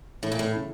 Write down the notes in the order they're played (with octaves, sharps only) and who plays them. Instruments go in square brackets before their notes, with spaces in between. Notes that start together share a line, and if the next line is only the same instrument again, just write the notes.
[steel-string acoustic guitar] A2 [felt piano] E3
[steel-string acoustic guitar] A#2
A2
[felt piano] C#3